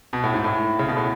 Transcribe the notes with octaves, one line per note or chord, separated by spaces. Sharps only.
B2
A2
G#2
A2
C#3
B2
A2